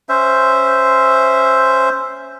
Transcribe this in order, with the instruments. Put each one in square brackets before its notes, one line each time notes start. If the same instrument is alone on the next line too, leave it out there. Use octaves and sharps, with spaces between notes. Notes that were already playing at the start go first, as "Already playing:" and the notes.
[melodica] C#4 C5 E5